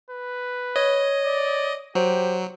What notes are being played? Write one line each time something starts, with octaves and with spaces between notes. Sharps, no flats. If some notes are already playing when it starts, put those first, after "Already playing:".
B4
C#5 D#5
D5
F#3 G4 C5